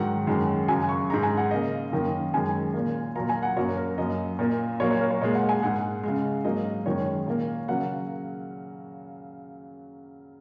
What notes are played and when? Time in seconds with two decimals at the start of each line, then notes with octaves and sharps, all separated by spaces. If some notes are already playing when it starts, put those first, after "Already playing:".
Already playing: G#2 D#3 F#3 F#5
0.27 F#2 D#3 G#3
0.68 F#2 C#3 F#3 G#5
0.89 C#6
1.10 G#2 G#3 A#5
1.23 G#5
1.37 F#5
1.51 C#3 A#3 D#5
1.92 F#2 D#3 A#3
2.33 F#2 D#3 G#3 G#5
2.74 A#2 A#3
3.16 A#2 F#3 A#3 A#5
3.29 G#5
3.43 F#5
3.57 F#2 F#3 A#3 C#5
3.77 A#4
3.98 F#2 F#3 A#3 D#5
4.39 A#2 A#3
4.80 A#2 F#3 A#3 C#5
4.90 C#5
5.01 A#4
5.11 C#5
5.21 A#2 G#3 D#5
5.35 F#5
5.49 G#5
5.62 G#2 G#3 F#5
6.03 C#3 G#3
6.44 G#2 F#3 A#3 D#5
6.86 F#2 D#3 G#3 C#5
7.27 A#2 A#3
7.68 C#3 F#3 A#3 F#5